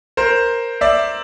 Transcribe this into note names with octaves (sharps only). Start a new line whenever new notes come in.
A#4 C5
D5 E5